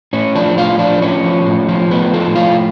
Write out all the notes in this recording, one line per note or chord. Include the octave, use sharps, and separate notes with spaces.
A2 C#4
F3 D4
A2 F4
F3 D4
A2 C#4
F3
A2
F3
A2 B3
F3 A3
A2 F4